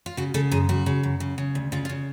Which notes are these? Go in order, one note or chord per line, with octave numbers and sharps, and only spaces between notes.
F4
C#3 F#4
C#3 A4
F#2 G#4
C#3 F#4
C#3
F#2
C#3
C#3
D2
C#3 F4
F4
C#3